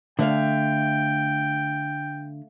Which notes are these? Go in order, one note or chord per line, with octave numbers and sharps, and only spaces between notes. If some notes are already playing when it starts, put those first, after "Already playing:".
D3 A3 E5 F5 G5